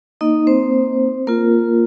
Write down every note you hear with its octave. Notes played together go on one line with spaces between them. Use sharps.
A#3 D#4 D#5
C4 C5
A#3 F4 A#4